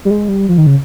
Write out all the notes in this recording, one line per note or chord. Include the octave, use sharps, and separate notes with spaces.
G3
G#3
G3
F3
D#3
C#3